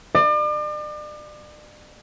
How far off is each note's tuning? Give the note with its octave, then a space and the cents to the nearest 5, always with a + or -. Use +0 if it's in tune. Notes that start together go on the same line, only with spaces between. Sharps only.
D5 +40